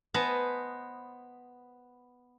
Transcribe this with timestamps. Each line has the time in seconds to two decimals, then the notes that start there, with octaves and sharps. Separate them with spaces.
0.14 B3 B4 C5 D#5 G#5 A5